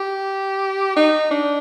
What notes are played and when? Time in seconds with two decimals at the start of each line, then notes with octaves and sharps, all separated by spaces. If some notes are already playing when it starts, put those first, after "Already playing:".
Already playing: G4
0.96 D#4
1.31 D4